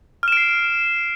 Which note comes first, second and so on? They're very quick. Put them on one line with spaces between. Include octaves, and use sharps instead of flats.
F6 E7 D7 C7